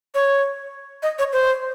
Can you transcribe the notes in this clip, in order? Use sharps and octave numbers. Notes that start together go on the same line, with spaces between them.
C#5
D#5
C#5
C5